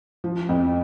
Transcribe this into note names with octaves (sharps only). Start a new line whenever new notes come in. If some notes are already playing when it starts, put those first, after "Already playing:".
F3
F2